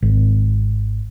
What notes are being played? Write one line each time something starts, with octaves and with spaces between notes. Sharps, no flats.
G#1